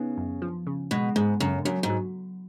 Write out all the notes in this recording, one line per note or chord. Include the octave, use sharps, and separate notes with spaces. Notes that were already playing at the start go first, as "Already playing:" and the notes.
Already playing: C#3 B3 D#4
F#2
F3
C#3
B2 G#3
G#2 G#3
F#2 C#3
F#2 F#3
G#2
F#3